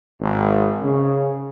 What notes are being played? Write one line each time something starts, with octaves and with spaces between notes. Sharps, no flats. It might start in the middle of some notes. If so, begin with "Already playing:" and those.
G#1
C#3